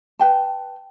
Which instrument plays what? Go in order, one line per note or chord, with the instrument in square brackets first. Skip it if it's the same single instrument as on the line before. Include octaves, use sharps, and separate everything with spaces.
[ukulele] B4 G5 A5